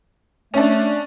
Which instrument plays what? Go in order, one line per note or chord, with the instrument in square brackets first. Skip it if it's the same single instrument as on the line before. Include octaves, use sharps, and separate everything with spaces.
[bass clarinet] A3 [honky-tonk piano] C#4 D4